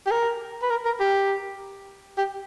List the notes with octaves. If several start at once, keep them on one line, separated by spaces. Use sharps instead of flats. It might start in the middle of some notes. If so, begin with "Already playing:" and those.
G4
A#4
B4
A#4
A#4
G4
G4